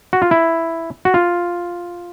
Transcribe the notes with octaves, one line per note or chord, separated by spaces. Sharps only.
F#4
F4
E4
F#4
F4